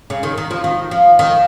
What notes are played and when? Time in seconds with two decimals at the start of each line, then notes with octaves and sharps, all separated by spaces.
0.10 C#3
0.23 D#3
0.37 D#3
0.51 F3
0.64 D#3
0.91 F3
1.19 D#3